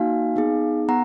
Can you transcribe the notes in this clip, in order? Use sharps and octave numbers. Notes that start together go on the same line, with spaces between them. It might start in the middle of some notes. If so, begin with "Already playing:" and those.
Already playing: A#3 D#4 F#4 F5 G#5
B3 D#4 G#4
B3 F#5 A#5